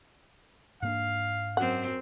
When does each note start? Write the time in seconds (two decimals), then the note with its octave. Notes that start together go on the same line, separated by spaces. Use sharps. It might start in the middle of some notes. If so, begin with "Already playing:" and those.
0.82 G#2 A#3 D4 F5
1.57 F#2 C4 F#5